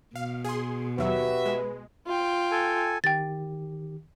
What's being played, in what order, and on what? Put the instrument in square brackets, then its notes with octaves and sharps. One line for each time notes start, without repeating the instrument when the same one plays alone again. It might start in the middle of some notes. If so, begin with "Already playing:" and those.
[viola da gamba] B2 [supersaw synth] F5
[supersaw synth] G#4 C6
[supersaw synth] D#2 F#3 [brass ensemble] F#4 G4 E5 [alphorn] B4
[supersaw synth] G#3
[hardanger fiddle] F4 G5
[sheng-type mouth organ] A4 G#5
[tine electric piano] D#3 G4 [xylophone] G5 A6